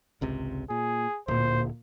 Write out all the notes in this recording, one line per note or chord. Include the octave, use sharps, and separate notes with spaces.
G#1 C#2 C3
A#2 G#4
D1 A#2 C5